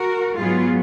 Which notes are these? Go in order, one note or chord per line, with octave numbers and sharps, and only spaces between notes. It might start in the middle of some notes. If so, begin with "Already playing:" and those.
Already playing: F#4 A#4
G#2 F#3 B3 F4 G#4